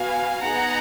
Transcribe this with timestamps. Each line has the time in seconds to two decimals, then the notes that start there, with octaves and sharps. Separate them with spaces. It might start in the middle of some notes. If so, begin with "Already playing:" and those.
Already playing: B3 F#4 F5 G#5
0.42 B3 D#4 G#4 F#5 A#5